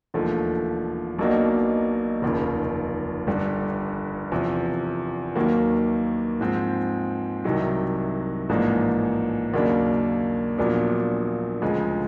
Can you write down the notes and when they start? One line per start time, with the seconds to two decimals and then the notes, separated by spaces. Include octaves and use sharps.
0.14 E1 D#2 D3 F3 A3
1.19 B1 B2 F#3 A#3 D4
2.22 F1 D#2 C#3 F3
3.27 G1 G2 D3 G3
4.32 E2 C3 F3
5.35 D#2 D#3 F#3 A#3
6.41 G#2 F3 G#3 C4
7.44 C2 C3 D#3 F#3
8.49 A1 G#2 F3 A#3 D4
9.54 D#2 C#3 F#3 A#3 D4
10.58 A#1 A#2 F#3 B3 D4
11.62 D2 C#3 F3 G#3